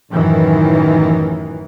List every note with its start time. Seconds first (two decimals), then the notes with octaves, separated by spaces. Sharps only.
0.13 A1 F#2 D#3 E3